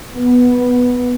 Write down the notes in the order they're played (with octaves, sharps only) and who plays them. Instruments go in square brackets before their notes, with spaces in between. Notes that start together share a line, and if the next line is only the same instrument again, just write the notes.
[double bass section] B3